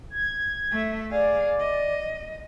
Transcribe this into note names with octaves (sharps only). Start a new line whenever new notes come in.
G#6
A3 E5
G#4 D5 F5
D#5